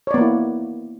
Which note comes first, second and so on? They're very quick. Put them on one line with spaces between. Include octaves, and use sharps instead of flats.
C#5 D5 B3 A#3 E4